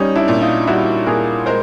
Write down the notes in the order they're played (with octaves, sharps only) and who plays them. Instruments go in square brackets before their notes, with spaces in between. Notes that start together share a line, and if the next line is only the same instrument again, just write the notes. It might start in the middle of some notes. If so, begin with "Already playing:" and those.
Already playing: [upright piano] G3 [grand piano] C#4 D#4
[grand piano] D4 E4
[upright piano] A#2
[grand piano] D#4 F4
[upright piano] G3 [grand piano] E4 F#4
[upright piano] A#2 [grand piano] G#4 A#4
[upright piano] G#3 [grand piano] A#4 C5